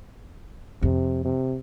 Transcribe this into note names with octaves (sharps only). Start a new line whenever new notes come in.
F2 C3
C3